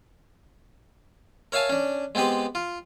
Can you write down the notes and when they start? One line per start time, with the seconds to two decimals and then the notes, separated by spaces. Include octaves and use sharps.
1.52 A#4 C#5 E5 F5 G#5 A5
1.70 C#4 D4
2.15 G#3 B3 C4 G4 B4
2.55 F4